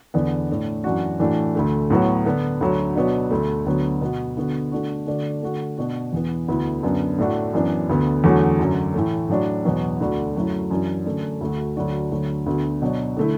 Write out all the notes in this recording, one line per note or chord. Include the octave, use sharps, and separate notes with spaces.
E2 D3 B3 D4
A2 A3 D4
F#2 E3 D4 F#4
A2 E3 A3 D4 F#4
D2 D3 A3
A2 F#3 B3 F#4
D3 B3 D4
D2 D3 F#3
B2 F#3 B3 D4
D2 D3 A3
D2 D3 F#3 B3
B2 B3 F#4
D3 B3 F#4
D3 A3 D4 F#4
D3 A3 D4 F#4
D3 A3 F#4
B2 B3 D4 F#4
E2 E3 B3
D2 D3 B3 E4
F#2 D3 B3 D4
A2 A3 D4 F#4
F#2 E3 B3 D4
D2 D3 B3
E2 D3 F#3 A3 F#4
F#2 D3 F#3
A2 E3 A3
A2 F#3 D4 F#4
E2 B2 F#3 B3
D2 D3 A3 D4 F#4
F#2 F#3 A3 E4
F#2 E3 D4 F#4
F#2 D3 A3 D4
D2 D3 A3 F#4
D2 D3 F#3 D4 F#4
D2 D3 F#3 A3
D2 D3 B3 F#4
B2 F#3 D4
D3 A3 E4